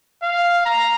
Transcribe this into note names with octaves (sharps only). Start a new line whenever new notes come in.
F5
A#5